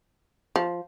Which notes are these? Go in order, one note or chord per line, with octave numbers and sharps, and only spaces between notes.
F3